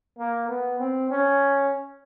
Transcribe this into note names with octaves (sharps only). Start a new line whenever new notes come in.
A#3
B3
C4
C#4